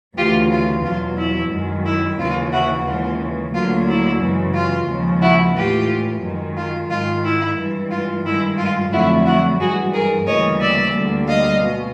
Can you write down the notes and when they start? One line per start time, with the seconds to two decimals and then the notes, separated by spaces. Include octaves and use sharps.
0.17 D2 C#3 E3 F4 G4
0.51 F4
0.84 E2 B2 F#3 F4
1.18 E4
1.51 F#2 D#3 G#3
1.85 E4
2.19 D#2 C#3 E3 F4
2.52 E4 F#4
2.86 D#2 C#3 E3 G#3 F4
3.54 D2 D3 F#3 A#3 F4
3.88 E4
4.21 F#2 C#3 E3 G#3
4.54 F4
4.88 D#2 C#3 F3 G#3
5.21 E4 F#4
5.56 A2 E3 G#3 F4 G4
6.22 F#2 D#3 G#3
6.57 F4
6.90 G#2 D#3 G#3 F4
7.24 E4
7.58 G2 E3 G#3
7.91 F4
8.26 G2 D#3 G#3 E4
8.58 F4
8.92 F2 D3 F#3 A3 E4 F#4
9.26 E4 F#4
9.60 G2 E3 G#3 F#4 G#4
9.93 G#4 A#4
10.27 D2 C#3 E3 G3 A#3 C#5 D#5
10.61 D5 E5
10.94 D2 D3 G3 A#3
11.28 D#5 F5
11.62 B2 G#3